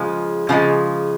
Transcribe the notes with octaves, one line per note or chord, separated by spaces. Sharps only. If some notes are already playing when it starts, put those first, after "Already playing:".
Already playing: C#3 F3 G#3
C#3 F3 G#3